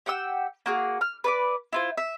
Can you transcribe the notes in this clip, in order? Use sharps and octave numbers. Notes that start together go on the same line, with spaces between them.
G4 F#5 G5 E6
A#3 F#4 G#4
F6
B4 D5 D6
E4 F4 C5
E5